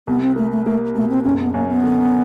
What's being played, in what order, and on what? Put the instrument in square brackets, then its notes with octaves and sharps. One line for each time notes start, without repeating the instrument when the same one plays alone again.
[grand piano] C2 [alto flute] B3
[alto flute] C4
[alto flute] A3 [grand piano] A#3
[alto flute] A3
[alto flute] A3 [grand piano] A#3
[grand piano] B2 [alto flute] A3
[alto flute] C4
[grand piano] F#1 [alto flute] C#4
[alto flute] B3
[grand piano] F#2 [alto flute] A#3
[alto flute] B3
[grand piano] D3